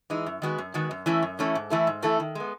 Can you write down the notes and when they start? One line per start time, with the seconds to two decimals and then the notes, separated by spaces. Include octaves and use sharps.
0.10 E3 G#3 D#4
0.26 F#2
0.42 D#3 G#3 B3 F#4
0.58 F#2
0.74 D#3 G#3 B3 F#4
0.91 F#2
1.06 E3 A3 C#4 E4
1.22 F#2
1.39 E3 A3 C#4 E4
1.55 G#2
1.70 E3 A3 E4 A4
1.87 G#2
2.02 E3 A3 E4 A4
2.20 D#3
2.35 G#3 B3